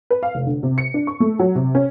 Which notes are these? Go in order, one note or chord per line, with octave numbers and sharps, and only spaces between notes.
B4
F5
F1
D3
C3
C#7
D4
C#6
A3
F#3
C3
C#4